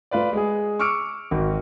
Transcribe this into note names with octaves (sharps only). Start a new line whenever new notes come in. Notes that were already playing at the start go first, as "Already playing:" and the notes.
A3 F4 B4 D5
G#3 G#4
C#6 D6 E6 F6 C#7 D7
G#1 F#4